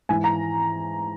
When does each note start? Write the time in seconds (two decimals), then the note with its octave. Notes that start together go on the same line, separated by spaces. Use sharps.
0.09 G#2 E3 G#5
0.24 A#5